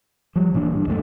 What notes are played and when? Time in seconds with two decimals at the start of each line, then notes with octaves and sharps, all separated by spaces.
0.36 F3 G3
0.53 D1 A#2 E3 D4
0.72 G2
0.87 C#2 F#2 G3 A3